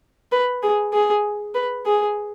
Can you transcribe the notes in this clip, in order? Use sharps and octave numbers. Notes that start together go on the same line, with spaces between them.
B4
G#4
G#4
B4
G#4